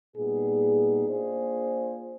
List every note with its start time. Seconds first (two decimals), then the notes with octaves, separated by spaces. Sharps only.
0.16 A#2 G3 B3 D#4 G#4
1.08 A#3 D4 F4 G#4 C5